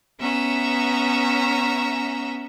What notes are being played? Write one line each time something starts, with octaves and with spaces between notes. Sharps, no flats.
B3 C#4 E5 A#5